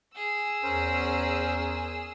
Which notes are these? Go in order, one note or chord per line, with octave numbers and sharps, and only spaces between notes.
G#4 E6
E2 C#4 A#4 C5